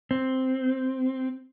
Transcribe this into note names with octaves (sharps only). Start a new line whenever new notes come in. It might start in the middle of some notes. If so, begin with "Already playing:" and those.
C4